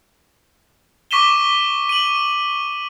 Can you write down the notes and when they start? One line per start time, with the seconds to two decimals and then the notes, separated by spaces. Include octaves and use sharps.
1.11 C#6 D6 B6 D#7 E7 G7
1.89 D#7 F#7